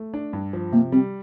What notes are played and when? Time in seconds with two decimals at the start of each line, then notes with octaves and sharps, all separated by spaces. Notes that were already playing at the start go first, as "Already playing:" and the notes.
Already playing: A3
0.14 D4
0.33 G2
0.53 F3
0.72 C3 A#3
0.92 G3 C4